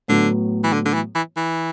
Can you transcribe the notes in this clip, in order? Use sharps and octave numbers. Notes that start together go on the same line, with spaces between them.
A2 D3 F#3 B3
E3
D3
D3
E3
E3
E3